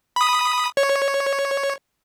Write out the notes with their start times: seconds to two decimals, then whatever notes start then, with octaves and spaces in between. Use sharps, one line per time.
0.16 B5 D#6
0.77 C#5